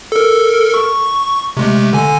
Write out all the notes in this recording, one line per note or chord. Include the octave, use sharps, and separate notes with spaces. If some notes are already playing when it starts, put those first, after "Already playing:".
A4 A#4
C#6
C3 G#3 A3
D3 G#5